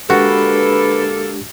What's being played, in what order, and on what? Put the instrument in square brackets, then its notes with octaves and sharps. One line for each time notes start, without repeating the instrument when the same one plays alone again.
[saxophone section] D3 A#3 A4 [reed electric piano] G#3 D4 G4 [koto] F#4 [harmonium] B4